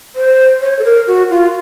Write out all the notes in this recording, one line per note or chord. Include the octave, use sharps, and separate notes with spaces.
C5
C#5
A4
A#4
F#4
F4